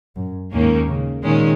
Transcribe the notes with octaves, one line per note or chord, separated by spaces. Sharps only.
F#2
D#2 G#2 D#3 A#3 C#4
C#3
A#2 D#3 G#3 C#4